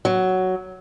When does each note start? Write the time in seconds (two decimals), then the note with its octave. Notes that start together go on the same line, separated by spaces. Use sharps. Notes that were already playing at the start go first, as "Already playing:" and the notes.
0.05 F#3